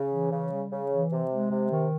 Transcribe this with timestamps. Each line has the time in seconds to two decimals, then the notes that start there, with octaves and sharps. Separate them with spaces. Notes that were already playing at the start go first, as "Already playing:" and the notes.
Already playing: C#3
0.12 E3
0.32 C#3
0.52 G3
0.72 C#3
0.91 E3
1.11 C3
1.31 G#3
1.51 C3
1.71 D#3